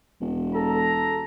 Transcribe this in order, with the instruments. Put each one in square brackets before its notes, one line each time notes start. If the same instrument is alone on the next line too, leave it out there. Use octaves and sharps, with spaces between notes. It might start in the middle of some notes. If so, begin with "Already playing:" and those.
[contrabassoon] E1
[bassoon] A4 [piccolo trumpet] A#5